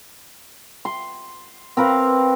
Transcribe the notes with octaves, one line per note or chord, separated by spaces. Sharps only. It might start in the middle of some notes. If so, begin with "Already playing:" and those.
C6
C4 A#4 B4 F5